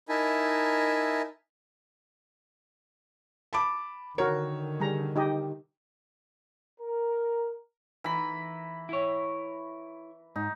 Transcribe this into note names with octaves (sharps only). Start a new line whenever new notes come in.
D#4 E4 A#4 E5 G#5 A5
A5 B5 D6
D3 D#3 F#4 A#4 C#5
G3 G#4 A#5
D#4 G4 D#5
A#4
E3 A#5 B5
E4 C#5
G#2 D#4